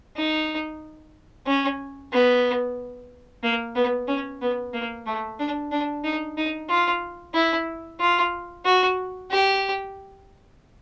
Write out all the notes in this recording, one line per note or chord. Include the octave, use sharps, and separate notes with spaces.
D#4
C#4
B3
A#3
B3
C#4
B3
A#3
A3
D4
D4
D#4
D#4
F4
E4
F4
F#4
G4